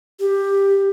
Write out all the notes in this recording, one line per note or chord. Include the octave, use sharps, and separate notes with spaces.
G4